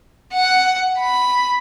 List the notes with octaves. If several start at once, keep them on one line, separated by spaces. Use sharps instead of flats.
F#5
B5